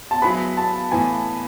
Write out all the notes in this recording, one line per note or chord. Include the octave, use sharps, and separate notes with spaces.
A5
F#3 B3 E4 G#4 B4 B5
A5
A2 E3 B3 G#5